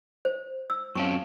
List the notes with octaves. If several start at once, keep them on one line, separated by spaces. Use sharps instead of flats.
C5
E6
F#2 C4 C#4 F5 A5 C#6